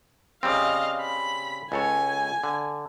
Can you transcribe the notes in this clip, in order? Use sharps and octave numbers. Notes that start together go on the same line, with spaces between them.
C#3 G3 C4 D#5 F5
B5
C#2 A4 C#5 G#5
D3